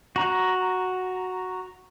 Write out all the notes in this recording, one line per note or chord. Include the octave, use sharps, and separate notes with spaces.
F#4 A#5